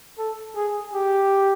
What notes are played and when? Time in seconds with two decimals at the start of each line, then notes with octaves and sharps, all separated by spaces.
0.18 A4
0.56 G#4
0.93 G4